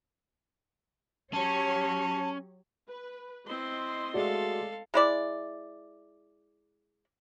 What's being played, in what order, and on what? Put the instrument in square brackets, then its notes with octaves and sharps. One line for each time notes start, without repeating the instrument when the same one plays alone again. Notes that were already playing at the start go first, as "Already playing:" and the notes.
[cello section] F#3 G4 C#5 [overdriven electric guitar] C#4 [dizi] A5
[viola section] B4
[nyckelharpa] C4 E4 [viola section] D#5 C6
[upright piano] G#3 A3 D5 [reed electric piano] F#4 [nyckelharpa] A4 F5
[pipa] G#3 E4 D5